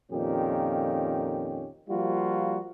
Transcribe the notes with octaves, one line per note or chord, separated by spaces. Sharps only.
F2 A#2 D#3 C#4 G4
F3 G3 A#3 F4 F#4